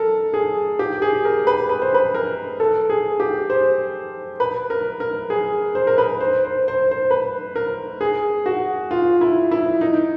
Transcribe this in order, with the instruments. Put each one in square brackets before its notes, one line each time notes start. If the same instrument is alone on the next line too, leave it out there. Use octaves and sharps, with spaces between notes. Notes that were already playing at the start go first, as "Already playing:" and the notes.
Already playing: [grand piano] A4 A#4
G#4
G4
G#4
A#4
B4
B4
C5
B4
A#4
A4
G#4
G4
C5
B4
A#4
A#4
G#4
C5
A#4
B4
C5
C5
C5
C5
B4
A#4
G#4
F#4
F4
E4
E4
D#4